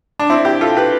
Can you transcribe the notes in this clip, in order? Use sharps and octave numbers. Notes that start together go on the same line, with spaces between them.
D4
C4 E4
E4 G4
F4 A4
G4 B4